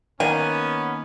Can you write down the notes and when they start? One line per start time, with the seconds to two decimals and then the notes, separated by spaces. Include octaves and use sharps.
0.20 D#3 A#3 B3 C#4 G#5